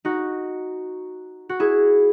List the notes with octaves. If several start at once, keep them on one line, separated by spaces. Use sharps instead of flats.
D#4 F#4
F#4
E4 G#4